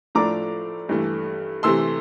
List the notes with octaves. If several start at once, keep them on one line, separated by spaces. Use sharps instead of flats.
A2 F3 A3 D4 A#5 D6
G2 E3 A3
C3 E3 A3 C6 E6